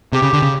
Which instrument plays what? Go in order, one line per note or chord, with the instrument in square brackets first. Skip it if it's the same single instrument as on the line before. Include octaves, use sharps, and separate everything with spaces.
[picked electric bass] C3 [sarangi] G4
[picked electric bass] C#3
D3
C#3